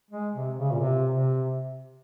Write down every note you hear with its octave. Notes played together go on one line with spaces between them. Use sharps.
G#3
C3
C#3
A#2
C3
C3